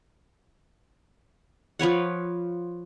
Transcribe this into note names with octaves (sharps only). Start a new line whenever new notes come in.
F3 B4 C#5 F#5